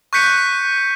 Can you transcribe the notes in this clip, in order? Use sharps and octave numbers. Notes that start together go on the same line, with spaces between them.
C#6 F#6 G6 B6 C#7 D#7